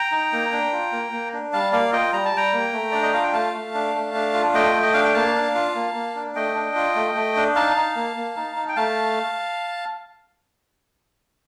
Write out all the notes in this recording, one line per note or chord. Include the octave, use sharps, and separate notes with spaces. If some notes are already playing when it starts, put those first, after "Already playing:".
Already playing: G5 A#5
D#4
A#3
D4
F4
A#3
A#3
D4
G3 F5 A5
A#3 D5 F5
F4 D#5 G5
G3 A#5
A5
G3 G5 A#5
A#3
A3
D4 D5
D#5
F4 F5
G5
A3 F5 A5
A3
D4
A3
D4
F4
A3 D#5 G5
A3
D#5
D4 F5
G5
A#3 F5 A5
D4
F4
A#3
A#3
D4
A3 D#5 G5
D4
F4
A3
A3
D4
D#4 F5 A5
D#4
A#3
A#3
D#4
D#4
G5
A3 F5 A5